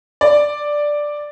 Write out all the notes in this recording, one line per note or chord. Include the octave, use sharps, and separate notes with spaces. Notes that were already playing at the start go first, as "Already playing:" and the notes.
D5